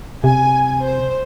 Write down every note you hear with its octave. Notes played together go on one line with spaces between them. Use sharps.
C3 G#5
C5